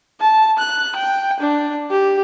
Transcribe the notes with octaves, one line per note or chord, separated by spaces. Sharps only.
A5
F#6
G5
D4
G4